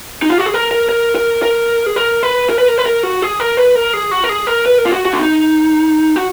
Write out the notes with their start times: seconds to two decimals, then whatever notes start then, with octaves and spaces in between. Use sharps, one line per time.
0.22 D#4
0.30 F4
0.38 F#4
0.46 G#4
0.54 A#4
0.71 A#4
0.89 A#4
1.16 A#4
1.43 A#4
1.86 G#4
1.96 A#4
2.23 B4
2.50 A#4
2.59 B4
2.68 A#4
2.78 B4
2.86 A#4
3.03 F#4
3.22 G#4
3.40 A#4
3.57 B4
3.76 A#4
3.94 G#4
4.11 F#4
4.24 A#4
4.29 G#4
4.47 A#4
4.66 B4
4.78 A#4
4.86 F4
4.92 F#4
5.05 F#4
5.13 D4
5.18 D#4
6.16 F#4